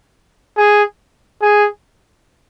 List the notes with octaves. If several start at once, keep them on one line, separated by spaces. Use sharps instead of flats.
G#4
G#4